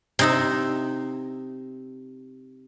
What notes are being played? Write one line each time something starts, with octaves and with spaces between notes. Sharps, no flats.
C3 D#4 E5